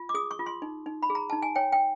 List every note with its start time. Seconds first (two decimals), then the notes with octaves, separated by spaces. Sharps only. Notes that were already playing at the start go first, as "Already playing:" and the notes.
Already playing: F4
0.09 D6
0.14 G#4 D#6
0.31 C#6
0.39 F4
0.46 C6
0.62 D#4
0.86 D#4
1.03 B5
1.10 G#4
1.15 A#5
1.30 D#4 A5
1.42 G#5
1.56 C#5 G5
1.72 G5